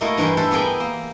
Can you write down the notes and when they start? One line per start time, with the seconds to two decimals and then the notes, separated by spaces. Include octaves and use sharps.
0.01 A3 A#3 E4 F#4 A#4 D#5
0.17 G2 E3 A#4 B4 E5 C6
0.37 A4 B4 C5 E5
0.51 B3 G4 G#4 A#4 G5 G#5
0.80 A#3